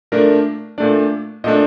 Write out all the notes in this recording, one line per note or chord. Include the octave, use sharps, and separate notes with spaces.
A#2 A3 D4 A#4
A#2 A3 D4 D5
A#2 A3 D4 D#5